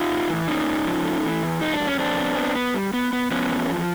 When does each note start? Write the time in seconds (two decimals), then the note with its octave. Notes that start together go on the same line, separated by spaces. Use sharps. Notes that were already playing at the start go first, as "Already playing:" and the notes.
Already playing: D#4 F4
0.10 A2
0.29 E3
0.48 A#3 C#4 D#4
0.67 G#2
0.86 F3
1.05 A3
1.24 E3
1.43 E2
1.61 F2 D#4
1.74 D4
1.80 F2
1.87 C#4
1.98 F2 C4 D4
2.18 B3
2.37 B3
2.56 B3
2.74 G3
2.94 B3
3.13 B3
3.31 F3 B3 C#4
3.50 E2
3.69 F3